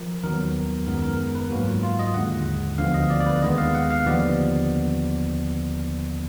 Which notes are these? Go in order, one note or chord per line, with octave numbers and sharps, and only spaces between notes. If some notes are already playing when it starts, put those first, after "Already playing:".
Already playing: F3 A#4
D#2 D#3 F#3 B3 A#4
F#2 D#3 G#3 B3 A#4
A#4
B4
G#2 F#3 A#3 F#4
F4
F4
D#5
D#2 D3 G#3 F#5
D2 D3 F3 B3 F5
D#5
D5
D5
B4
D#2 D#3 G#3 B3 D#5
F5
F#5
F5
D#2 D3 F3 B3 D5